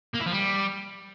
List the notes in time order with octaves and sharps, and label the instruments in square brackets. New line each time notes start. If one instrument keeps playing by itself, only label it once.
[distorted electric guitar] A#3
E4
F3
G3